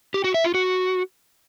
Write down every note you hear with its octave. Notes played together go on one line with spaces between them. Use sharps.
G4
F#4
E5
F4
F#4